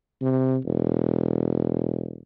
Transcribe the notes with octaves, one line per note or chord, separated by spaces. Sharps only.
C3
E1